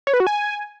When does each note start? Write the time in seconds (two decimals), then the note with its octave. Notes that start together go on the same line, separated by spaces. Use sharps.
0.07 C#5
0.14 B4
0.20 F#4
0.27 G#5